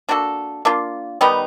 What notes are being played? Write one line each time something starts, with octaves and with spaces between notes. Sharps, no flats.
A#3 D4 F#4 A4
A#3 D4 F4
D#3 G3 B3 D#4